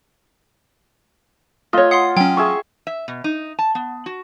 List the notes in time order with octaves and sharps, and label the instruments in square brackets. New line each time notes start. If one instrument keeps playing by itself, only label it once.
[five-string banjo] A3 C#5 [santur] F4 D#5
[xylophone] F#5 C6 [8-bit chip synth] D#6 C7
[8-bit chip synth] F#3 C#4 [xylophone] G5
[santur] G#4 E5 C#6
[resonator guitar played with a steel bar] E5
B2
D#4
A5
B3
F#4